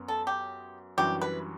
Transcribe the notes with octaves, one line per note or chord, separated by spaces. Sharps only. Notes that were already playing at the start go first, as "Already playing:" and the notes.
Already playing: F#2 F#3 B3
A4
G4
F#2 E3 G3 D4 F#4 G4
B4